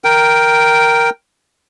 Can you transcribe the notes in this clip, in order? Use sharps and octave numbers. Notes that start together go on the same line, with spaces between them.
A#4 G5